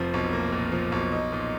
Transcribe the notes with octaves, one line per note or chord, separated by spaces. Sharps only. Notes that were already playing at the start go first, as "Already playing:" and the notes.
Already playing: F1 F3
B1
A#3
A#2
F3
B1
D#4
A#2